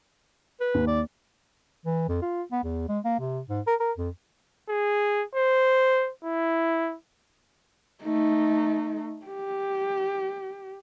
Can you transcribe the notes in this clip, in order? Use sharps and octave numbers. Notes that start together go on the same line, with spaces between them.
B4
D#2
D5
E3
F2
F4
B3
E2
G#3
A#3
C3
G#2
A#4
A#4
F2
G#4
C5
E4
A3 D#4
G4